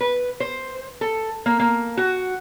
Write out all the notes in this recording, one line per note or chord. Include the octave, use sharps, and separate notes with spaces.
B4
C5
A4
A#3
A#3
F#4